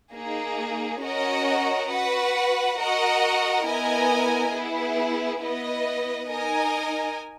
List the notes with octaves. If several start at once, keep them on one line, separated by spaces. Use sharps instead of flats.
A#3 D#4 G#4
C#4 F#4 A#4 D#5 F#5
F#4 B4 F#5
F#4 A#4 D#5 F#5
B3 E4 A#4 D#5 G#5
B3 E4 G#4
B3 E4 B4 D#5
D#4 A#4 D#5 G#5